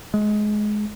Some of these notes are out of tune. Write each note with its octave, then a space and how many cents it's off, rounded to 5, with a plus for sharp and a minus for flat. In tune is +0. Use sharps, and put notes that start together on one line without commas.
G#3 +20